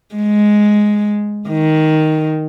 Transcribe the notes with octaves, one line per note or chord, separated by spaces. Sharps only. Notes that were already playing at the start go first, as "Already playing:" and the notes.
G#3
D#3